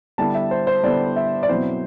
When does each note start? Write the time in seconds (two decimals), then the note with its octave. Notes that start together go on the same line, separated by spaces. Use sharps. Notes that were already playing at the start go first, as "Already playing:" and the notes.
0.18 D3 G3 B3 E4 A5
0.35 E5
0.51 C5
0.67 C5
0.83 D3 G3 B3 E4 D5
1.16 E5
1.43 D5
1.49 B2 F#3 C4 E4 C5